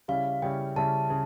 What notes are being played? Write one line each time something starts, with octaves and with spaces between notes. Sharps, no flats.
C#3 G3 C#4 E4 F5
C#3 G3 C#4 E4 G5
C#3 G3 C#4 E4 A5
C#3